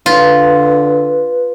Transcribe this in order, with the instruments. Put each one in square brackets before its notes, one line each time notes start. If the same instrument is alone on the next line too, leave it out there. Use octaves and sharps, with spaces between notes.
[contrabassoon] D3 [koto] F4 [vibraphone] B4